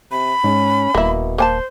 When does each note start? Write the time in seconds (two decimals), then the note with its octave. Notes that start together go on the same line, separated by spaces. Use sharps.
0.11 C3 B5
0.44 G#2 C#4
0.95 D#1 B2 A#3 E4
1.38 A#3 C5 G#5 A5